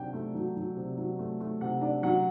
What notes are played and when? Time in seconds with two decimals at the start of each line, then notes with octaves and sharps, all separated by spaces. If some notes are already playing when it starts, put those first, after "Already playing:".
Already playing: C3 F#3 D4 G5
0.13 A3
0.34 F#3
0.56 F#3
0.76 C3
0.97 F#3
1.19 A3
1.40 A3
1.61 C3 F#5
1.81 D4
2.03 F#3 F#5